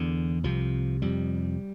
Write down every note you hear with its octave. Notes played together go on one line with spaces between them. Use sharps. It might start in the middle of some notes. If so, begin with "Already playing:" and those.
Already playing: E2 D3 E3
C2 C3 F3
F2 C3 G3